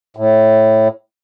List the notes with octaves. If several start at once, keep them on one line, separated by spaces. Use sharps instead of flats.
A2